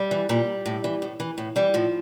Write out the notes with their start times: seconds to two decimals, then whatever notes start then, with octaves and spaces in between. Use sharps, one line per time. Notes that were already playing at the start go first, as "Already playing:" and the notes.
Already playing: G3
0.11 E3
0.29 A#2 G3
0.66 A2
0.84 E3
1.02 A2
1.20 E3
1.38 A2
1.56 E3 G3
1.74 A2 F3